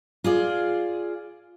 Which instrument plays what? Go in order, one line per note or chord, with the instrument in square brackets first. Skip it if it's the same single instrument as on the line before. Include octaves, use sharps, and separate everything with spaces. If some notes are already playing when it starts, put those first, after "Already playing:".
[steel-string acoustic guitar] F4 G#4 D5